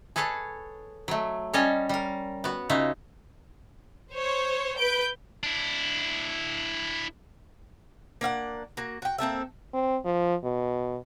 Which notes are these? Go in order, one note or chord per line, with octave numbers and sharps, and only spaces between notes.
G#4 A4 B4 C#5 A5
F#3 A3
G3 C#4 C#5 D#5 G#5 A5
G3 A#4
B3 F#4
C#3 D#4 F4 F#4 E5
C5 C#5
B4 G6 D7
D4 E4
A#3 D4 F5 F#5
A#3 F#4
F#4 G5
A#3 C4 A4 E5
C4
F3
B2